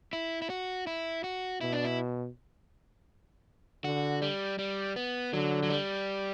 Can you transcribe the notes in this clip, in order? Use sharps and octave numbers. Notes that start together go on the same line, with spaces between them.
E4
E4
F#4
E4
F#4
B2 E4
D4
E4
D3 F#4
G3
G3
B3
D3 F#3
F#3
G3